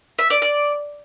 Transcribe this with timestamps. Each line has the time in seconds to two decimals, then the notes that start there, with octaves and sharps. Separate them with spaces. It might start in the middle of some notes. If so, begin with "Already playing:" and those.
0.19 E5
0.30 D5
0.42 D5